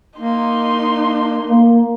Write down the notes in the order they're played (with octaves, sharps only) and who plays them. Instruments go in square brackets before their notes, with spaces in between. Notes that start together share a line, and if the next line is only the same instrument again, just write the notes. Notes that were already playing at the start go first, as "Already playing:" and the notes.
[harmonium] A#3 [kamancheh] D#4 C6
[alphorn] A#3